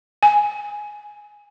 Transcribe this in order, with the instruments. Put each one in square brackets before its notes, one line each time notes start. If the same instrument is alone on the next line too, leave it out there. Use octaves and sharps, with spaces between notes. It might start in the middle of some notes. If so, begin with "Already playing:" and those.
[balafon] G#5